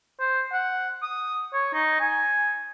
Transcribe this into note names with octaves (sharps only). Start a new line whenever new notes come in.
C5
F#5
D#6
C#5
D#4
G#5